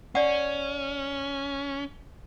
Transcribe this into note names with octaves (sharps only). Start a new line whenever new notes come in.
C#4 D5 F#5